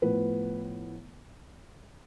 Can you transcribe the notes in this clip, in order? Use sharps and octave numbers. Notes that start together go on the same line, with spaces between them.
A2 F3 B3 B4